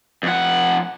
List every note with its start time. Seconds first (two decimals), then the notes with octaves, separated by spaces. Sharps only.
0.23 F2 F#5